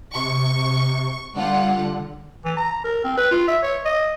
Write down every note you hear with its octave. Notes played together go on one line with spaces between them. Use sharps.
C3 C#6
D3 G3 F4 F#5
E3
A#5
A#4
C4
B4
F4
E5
C#5
D#5